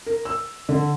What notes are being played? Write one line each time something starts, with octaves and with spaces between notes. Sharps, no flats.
A#4
E6
D3